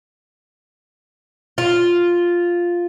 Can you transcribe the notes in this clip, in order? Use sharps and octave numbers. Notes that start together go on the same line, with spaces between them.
F4